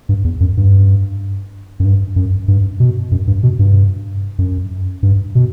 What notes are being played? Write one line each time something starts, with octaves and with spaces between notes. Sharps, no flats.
G2
E2
F#2
G2
F#2
G2
F#2
G2
B2
F#2
G2
B2
G2
F#2
G2
B2